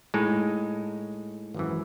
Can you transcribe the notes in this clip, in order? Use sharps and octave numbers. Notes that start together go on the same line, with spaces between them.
A2 G#3 D#4
G#1 F#2 E3